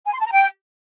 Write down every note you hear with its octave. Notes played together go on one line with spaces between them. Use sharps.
G#5
C6
A5
A#5
G5